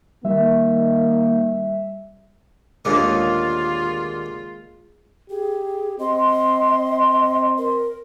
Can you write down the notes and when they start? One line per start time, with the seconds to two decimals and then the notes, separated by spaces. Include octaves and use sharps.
0.25 D#3 G3 A#3 E5
2.85 D#2 A#2 D3 G#3 A#3 C#4 F4
5.30 G4 G#4
5.99 C4 D#5 C6
7.58 A#4